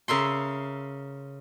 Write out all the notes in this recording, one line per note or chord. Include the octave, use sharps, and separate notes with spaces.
C#3 A#4 E5 C6